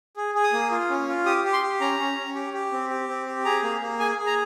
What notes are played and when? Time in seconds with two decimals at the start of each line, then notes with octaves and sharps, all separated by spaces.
0.17 G#4
0.35 G#4
0.44 D#6
0.53 A#3
0.71 F4
0.90 C#4
1.08 F4
1.25 G4 D#6
1.44 G4
1.53 C6
1.63 G4
1.81 C#4 A#5
1.99 C#4
2.18 C#4
2.35 G4
2.53 G4
2.72 C4
2.90 G4
3.09 C4
3.26 G4
3.45 G#4 A#5
3.63 A#3
3.81 A#3
4.00 G#4 G#5
4.18 G#4
4.26 A#5